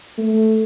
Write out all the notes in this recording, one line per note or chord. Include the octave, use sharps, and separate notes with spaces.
A3